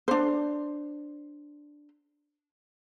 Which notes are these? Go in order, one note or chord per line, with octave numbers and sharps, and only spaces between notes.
D4 C5